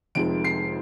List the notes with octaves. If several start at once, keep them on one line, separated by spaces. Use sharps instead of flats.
F1 F2 D#3 G#3 D7
C7